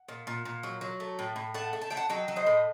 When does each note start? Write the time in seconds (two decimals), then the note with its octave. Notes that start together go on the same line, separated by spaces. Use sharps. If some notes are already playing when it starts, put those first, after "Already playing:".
Already playing: F#5
0.08 A#2
0.27 A#2
0.45 A#2
0.63 F#3
0.81 F#3
1.00 A3
1.19 A2
1.36 A2
1.54 A3 F#5 A5
1.73 A3
1.81 A5
1.90 A3 G5
1.97 F#5 A5
2.09 F#3 D#5 G5
2.28 F#3
2.36 C5 D#5
2.46 A2